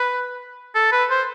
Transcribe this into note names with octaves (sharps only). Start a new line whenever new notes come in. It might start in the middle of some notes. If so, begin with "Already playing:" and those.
Already playing: B4
A4
B4
C5